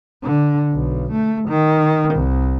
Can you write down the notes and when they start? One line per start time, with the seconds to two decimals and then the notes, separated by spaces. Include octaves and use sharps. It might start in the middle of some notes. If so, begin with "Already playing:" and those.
0.23 D3
0.72 B1
1.12 A3
1.48 D#3
2.14 C2